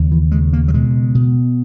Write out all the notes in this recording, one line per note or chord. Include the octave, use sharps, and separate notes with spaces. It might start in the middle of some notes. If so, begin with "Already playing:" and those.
Already playing: D#2 C#3
E3
C#3 G#3
A#3
F#3
B2 G#3
B2